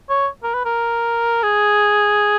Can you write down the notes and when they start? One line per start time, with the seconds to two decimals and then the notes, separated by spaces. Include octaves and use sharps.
0.09 C#5
0.43 A#4
0.54 B4
0.65 A#4
1.43 G#4